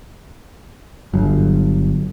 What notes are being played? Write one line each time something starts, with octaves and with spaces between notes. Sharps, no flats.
G1 F#3